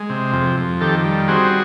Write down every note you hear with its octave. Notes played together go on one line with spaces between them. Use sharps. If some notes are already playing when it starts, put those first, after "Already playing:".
Already playing: G#3
C3
F2
F2
D#3 G4 A4
G3
C4 F#4 G#4